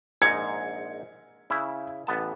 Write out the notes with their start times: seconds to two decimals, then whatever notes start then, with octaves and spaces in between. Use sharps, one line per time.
0.22 A#1 G#2 D#4 G#6 C#7
1.50 C#3 E4
2.07 A1 B3 A5